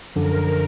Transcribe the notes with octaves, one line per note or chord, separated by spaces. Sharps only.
F#2 D3 F3 A#4